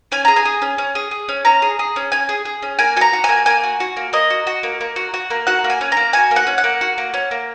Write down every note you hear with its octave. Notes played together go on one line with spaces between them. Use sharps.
C#4 G#5
G#4 A#5
G#5
G#4
C#4
C#4
G#4
G#4
C#4
C#4 A#5
G#4
G#4
C#4
C#4 G#5
G#4
G#4
C#4
A#3 G#5
F#4 G#5 A#5
F#4
G#5
A#3
A#3 G#5
F#4
F#4
A#3
A#3 D#5
F#4
F#4
A#3
A#3
F#4
F#4
A#3
F#4 F#5
A#3
G#5
C#4
A#3 A#5
F#4 G#5
A#3
F#5
C#4
F#5
A#3
F#4
A#3
C#4
A#3